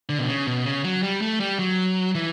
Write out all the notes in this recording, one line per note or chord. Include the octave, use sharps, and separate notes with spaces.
D3
B2
C#3
B2
C#3
F#3
G3
A3
G3
F#3
E3